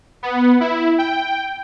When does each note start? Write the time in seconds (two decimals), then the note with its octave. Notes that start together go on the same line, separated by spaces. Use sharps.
0.23 B3
0.60 E4
0.98 G5